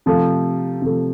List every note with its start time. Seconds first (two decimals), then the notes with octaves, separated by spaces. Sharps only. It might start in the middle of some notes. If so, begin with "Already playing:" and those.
0.06 C3 F3 A3
0.82 C3 F3 A3